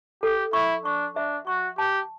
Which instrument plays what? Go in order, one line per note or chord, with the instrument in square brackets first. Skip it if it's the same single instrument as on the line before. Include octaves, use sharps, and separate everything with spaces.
[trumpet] G4 [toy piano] A4
[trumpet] E4 [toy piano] C#6
[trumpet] D4 [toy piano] C#6
[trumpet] D4 [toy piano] E5
[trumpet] F#4 [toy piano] C#6
[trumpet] G4 [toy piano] A5